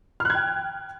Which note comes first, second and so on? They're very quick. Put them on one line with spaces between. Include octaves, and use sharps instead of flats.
F6 F#6 G#6 G5